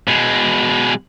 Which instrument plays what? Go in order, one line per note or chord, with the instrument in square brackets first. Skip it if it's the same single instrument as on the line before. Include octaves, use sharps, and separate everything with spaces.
[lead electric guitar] B2 G#3